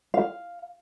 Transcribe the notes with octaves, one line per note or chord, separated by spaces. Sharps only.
F5